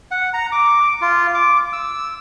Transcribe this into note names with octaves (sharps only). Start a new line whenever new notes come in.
F#5
A#5
D6
F4
D6
E6